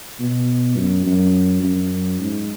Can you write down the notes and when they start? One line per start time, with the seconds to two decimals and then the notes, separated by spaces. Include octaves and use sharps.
0.20 B2
0.77 F#2
1.06 F#2
1.64 F#2
2.20 G#2